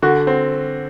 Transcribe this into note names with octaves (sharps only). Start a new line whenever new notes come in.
D3 F#4
C4